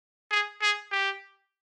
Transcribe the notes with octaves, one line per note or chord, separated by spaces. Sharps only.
G#4
G#4
G4